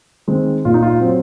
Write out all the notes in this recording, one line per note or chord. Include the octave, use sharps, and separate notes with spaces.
D#3 G#3 C4
A#2 F4
D#4
F4
F#3 C4